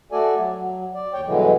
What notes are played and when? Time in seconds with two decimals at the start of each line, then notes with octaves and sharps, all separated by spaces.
0.12 A3 F#4 A4 D5 G#5
0.38 F#3
0.58 F#3
0.94 D5
1.13 D#2 C#5 G5
1.26 G2 B2 D3 E3 F#3 G#3